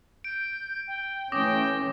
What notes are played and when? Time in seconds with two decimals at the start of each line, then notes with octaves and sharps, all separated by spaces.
0.24 G6 D7
0.87 G5
1.32 E3 A3 C#4 G5 D6 D#6 A#6